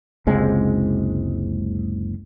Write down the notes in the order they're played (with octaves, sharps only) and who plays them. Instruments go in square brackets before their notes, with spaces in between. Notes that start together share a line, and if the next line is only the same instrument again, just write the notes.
[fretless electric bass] F#1 C#2 C3 G#3